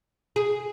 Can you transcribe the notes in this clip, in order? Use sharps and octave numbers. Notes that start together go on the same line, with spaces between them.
G#4